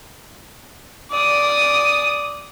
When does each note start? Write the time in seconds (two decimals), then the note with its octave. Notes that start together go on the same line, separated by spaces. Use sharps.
1.11 D5 D#6